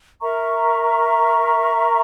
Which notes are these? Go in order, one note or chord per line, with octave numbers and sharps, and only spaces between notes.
A#4 E5 A#5 C#6